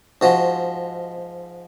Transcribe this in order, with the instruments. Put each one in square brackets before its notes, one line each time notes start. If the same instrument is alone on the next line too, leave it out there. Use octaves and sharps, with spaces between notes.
[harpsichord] G#2 F3 F#4